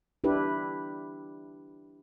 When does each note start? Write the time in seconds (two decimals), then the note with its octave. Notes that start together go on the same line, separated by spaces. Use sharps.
0.24 D4 E4 G4 B4